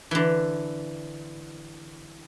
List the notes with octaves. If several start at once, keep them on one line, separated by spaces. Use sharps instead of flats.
D3 E3